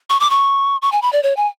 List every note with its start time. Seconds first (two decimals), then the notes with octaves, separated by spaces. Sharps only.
0.10 C#6
0.20 D6
0.30 C#6
0.82 C#6
0.92 G#5
1.02 B5
1.13 D5
1.23 C#5
1.37 G#5